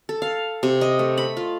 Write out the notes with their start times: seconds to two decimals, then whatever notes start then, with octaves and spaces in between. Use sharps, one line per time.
0.09 A4
0.22 F5
0.63 C3
0.81 D#5
0.99 A3
1.17 B5
1.37 F4